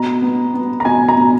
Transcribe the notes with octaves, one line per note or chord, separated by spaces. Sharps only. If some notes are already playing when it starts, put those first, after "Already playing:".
Already playing: B2 A#5
B3
B3
A#5
B2 G#5
A#5
B2